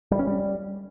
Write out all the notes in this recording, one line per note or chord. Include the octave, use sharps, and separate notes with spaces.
G3
C#4
G3